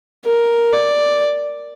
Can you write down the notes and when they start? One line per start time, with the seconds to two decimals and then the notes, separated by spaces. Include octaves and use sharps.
0.25 A#4
0.73 D5